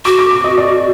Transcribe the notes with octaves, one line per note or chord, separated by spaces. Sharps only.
F#4 D6
D6
D6
D#5
D5